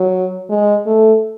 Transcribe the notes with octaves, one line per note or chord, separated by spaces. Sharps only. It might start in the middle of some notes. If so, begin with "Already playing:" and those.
Already playing: F#3
G#3
A3